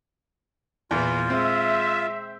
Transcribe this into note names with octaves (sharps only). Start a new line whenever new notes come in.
E2 A#2 E3 F4
G#3 C4 E5